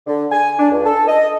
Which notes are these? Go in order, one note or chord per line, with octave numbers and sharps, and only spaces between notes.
D3
G#5
D4
C#2
A4
D#5